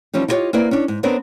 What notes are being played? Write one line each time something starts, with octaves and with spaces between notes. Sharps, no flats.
E3 F3 G3 C#4 D#4
E4 F4 G4 A#4 C#5 D#5
A#3 C4 E4 B4 D5
C#4 D4
G#2
B3 C4 D4 A#4 B4 C#5